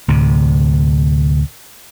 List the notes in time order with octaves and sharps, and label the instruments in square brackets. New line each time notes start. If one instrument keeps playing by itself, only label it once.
[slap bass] D2 A2 C3